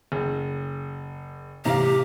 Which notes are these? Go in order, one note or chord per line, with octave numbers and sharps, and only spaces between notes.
F#1
A1 C3 G4 F5 A#5